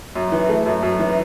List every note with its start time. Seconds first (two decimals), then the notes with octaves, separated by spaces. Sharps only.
0.16 F#2
0.32 E3
0.49 A3
0.66 F#2
0.83 F#2
0.99 E3